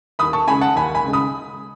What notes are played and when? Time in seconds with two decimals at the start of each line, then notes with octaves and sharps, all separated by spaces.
0.19 D#2 B5 D#6
0.33 A5 C#6
0.47 C#3 G#3 G#5 B5
0.61 F#5 A5
0.76 D#2 G#5 B5
0.95 G#5 B5
1.04 C#3 G#3
1.13 B5 D#6